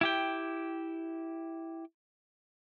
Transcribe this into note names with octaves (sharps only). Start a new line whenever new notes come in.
E4 G4 G5